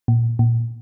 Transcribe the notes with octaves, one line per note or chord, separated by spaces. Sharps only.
A#2
A#2